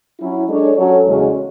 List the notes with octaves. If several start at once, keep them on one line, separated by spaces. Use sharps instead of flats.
F#3 C#4 E4
G#3 D4 A4 C#5
F#3 C#4 F#4 A4 C#5
E2 C#3 G#3 C#4 F#4